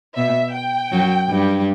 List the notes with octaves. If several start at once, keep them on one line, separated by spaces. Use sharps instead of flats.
B2 E5
G5
F#2 F#3
G2 G3